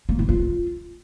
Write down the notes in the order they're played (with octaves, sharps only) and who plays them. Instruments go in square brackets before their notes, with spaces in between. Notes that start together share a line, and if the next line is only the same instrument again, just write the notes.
[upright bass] A#3
E4
F4